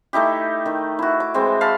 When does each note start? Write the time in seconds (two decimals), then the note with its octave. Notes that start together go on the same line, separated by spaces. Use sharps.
0.13 A3 D#4 E4 G4
0.66 D#3
0.99 E4 F#4
1.20 D6
1.34 E3 G#3 C4
1.61 F5 A5 B5